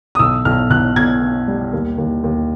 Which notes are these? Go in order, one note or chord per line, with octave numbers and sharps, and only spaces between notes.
D#6
B1 E6
B1 F6
B1 F#6
B2 G#6
B2
G3
D#2
D#2
D#2